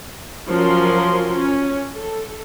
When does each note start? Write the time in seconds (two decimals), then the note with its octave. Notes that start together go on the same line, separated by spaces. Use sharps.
0.50 F3 F#3 C#4 F4 A#4 C6
1.34 C#4
1.95 A4